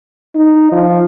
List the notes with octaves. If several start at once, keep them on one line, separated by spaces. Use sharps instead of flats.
D#4
F3